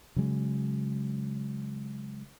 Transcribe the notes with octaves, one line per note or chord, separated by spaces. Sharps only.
C#3 F#3 G#3